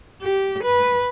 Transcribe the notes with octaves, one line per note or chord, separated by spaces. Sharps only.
G4
B4